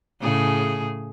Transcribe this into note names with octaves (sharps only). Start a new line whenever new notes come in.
A2 C#3 G#4